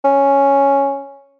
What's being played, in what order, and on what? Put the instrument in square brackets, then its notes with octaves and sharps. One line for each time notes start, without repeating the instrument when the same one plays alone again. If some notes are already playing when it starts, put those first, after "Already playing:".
[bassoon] C#4